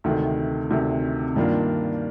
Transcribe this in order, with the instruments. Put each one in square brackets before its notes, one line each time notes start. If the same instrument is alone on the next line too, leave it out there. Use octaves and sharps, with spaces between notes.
[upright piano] D2 C3 D#3 A3
D2 C3 D#3 A3
G2 D#3 A#3 D4 F4